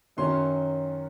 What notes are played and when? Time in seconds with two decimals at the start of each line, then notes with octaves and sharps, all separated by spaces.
0.17 F#2 D#3 F#3 C#4 C6